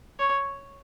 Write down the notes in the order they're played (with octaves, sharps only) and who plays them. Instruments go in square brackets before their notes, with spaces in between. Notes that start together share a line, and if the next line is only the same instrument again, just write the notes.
[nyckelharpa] C#5